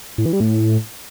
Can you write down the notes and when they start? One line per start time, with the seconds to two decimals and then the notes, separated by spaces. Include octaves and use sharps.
0.18 A2
0.26 E3
0.33 G3
0.40 A2